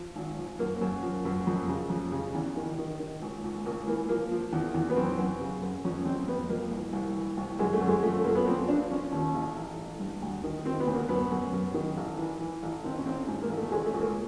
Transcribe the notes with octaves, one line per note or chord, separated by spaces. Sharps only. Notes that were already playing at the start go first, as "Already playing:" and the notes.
Already playing: F3
G#1
F3
F#2 A#3
F#2
F3
F#2
F2
C#3
F2
C#3
E2
D#3
D#3
D#3
C#2
C#2
C#2 A#3
E3 A#3
F3 A#3
F3
E2
E2
B3
F#2 C4
F#2
C#3
F#2
F2 C#4
F2 C4
F2 B3
F2 A#3
C2
C2
E3
C2
F#2 G#3
A3
F#2
G#3
F3 A3
A3
F#2 A#3
B3
F3 C4
F3 D4
F3 C#4
D#2
A1
A1
A1
G2
D2
D#3
D#3 C4
B3
D2
A#3
F#2 B3
F#2
F#2
D#3
A1
E3
E3
A1
D#3 C4
C#4
A1 C4
G#2
A#3
A1
A3
C#2 G#3
A3
C#2
A#3